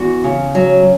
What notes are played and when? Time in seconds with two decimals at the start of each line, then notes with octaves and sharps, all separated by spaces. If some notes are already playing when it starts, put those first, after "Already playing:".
Already playing: E2 F#4
0.24 C#3
0.55 F#3